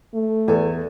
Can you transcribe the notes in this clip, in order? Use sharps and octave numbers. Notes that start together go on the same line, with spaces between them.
A3
E2 A4 C#5 G#5